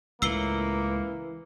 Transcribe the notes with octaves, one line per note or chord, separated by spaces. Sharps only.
C#2 A2 E3 A#3 E6 C7 G7